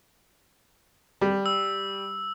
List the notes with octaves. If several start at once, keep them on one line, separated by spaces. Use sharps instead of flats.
G3
E6